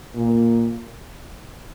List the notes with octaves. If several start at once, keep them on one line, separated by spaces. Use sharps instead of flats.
A#2